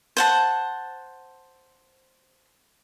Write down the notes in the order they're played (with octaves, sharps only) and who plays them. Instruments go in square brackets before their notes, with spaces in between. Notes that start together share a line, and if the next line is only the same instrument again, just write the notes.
[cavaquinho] C5 F#5 A5